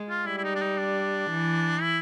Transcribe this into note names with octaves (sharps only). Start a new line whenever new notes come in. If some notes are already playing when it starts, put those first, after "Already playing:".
Already playing: G#3
F4
G3 E4
E4
D#4
D4
D#4
D4
E3
E4